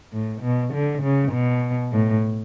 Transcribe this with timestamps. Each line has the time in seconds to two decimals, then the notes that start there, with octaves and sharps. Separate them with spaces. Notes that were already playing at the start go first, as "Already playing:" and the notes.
0.13 A2
0.42 B2
0.73 D3
1.03 C#3
1.33 B2
1.92 A2